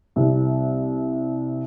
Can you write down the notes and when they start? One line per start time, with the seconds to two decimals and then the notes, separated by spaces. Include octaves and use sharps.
0.16 C2 C3